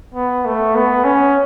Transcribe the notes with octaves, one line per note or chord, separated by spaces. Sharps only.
B3
A3
B3
C#4